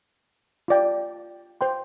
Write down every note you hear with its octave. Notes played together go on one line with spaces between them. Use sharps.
F4 D5 G5
C5 G5 C6